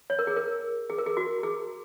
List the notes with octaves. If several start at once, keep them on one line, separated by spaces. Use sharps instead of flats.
C#5
A#4
G#4
A#4
G#4
A#4
G#4
F#4
G#4